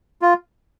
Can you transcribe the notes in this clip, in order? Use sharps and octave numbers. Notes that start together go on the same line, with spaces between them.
F4